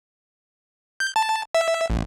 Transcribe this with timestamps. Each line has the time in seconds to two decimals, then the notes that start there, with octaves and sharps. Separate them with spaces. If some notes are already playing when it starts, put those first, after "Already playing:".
1.00 G6
1.16 A5
1.55 E5
1.90 A1